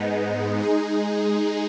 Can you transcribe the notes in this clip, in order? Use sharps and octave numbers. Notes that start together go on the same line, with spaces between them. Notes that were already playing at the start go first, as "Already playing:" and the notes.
Already playing: G#2 G#3 B3 D#4
G#3 D#4 G#4